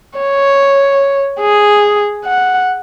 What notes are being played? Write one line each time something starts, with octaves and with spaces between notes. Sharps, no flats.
C#5
G#4
F#5